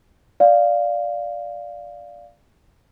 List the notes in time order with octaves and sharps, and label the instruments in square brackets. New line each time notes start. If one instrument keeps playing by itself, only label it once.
[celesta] D5 F5